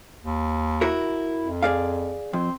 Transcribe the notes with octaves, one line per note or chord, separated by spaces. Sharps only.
D#2
E4 F#4 A#4
F2
G#4 D5 F5
F2 C4